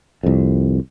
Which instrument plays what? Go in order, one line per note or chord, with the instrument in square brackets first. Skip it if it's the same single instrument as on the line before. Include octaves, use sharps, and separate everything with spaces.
[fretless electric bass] C2 F2